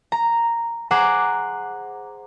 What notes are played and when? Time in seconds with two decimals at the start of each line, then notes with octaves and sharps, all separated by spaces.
0.12 A#5
0.91 G#4 C5 F#5 A#5 D6